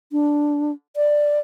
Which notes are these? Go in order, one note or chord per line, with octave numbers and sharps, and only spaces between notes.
D4
D5